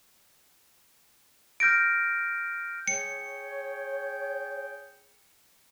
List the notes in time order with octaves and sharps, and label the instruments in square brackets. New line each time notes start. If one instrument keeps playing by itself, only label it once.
[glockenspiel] F6 G6 A#6 D7
[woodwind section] G#4 G5 [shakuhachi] C#5 [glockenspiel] C#7